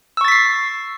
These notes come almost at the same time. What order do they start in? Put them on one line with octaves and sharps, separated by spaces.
E6 C#6 A6 B6 C7